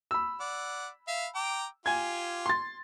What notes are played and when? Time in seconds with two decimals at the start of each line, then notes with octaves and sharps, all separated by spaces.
0.11 B5 E6
0.40 D5 F#5
1.08 E5 F5
1.35 G5 A#5 D6
1.86 F4 G4 G#5 G#6
2.46 C6 A6